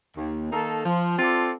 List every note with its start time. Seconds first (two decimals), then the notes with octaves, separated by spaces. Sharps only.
0.17 D#2
0.51 D#3 A#3 D#4 A4
0.85 F3
1.18 C4 F4 A4 D5